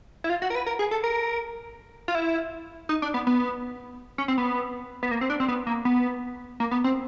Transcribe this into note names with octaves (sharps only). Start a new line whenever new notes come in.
E4
F4
F#4
A#4
B4
A#4
G#4
A4
A#4
F4
E4
D#4
D4
B3
B3
C#4
C4
B3
B3
A#3
C4
D4
C4
B3
A#3
B3
A#3
B3
C4